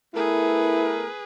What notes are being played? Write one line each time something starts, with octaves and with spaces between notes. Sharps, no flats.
A3 B3 E4 G#4 A#4 B4